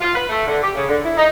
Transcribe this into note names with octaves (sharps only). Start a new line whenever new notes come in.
F4
B4
A3
D3
G4
C#3
D3
E4
D#4